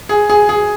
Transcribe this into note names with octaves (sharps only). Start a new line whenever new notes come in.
G#4
G#4
G#4